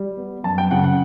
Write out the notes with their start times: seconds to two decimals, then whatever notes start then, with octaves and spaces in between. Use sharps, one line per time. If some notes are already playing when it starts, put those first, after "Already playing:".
Already playing: G3
0.17 B3
0.44 F#2 A5
0.58 G5
0.71 C#3 F#5
0.84 F#5